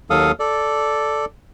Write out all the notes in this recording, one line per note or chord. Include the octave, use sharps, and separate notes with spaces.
D#2 F#3 A4 F5 D#6
A4 D5